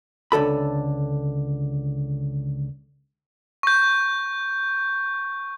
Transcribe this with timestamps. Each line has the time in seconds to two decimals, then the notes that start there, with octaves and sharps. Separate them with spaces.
0.32 C#2 D3 A4 B5
3.63 C#6 G6